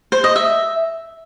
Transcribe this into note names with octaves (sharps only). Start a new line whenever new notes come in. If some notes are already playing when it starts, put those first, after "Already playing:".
C5
D#5
E5